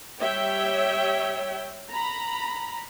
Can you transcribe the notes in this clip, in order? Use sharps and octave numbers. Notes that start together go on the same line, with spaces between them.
G3 C#5 E5 G5
A#5 B5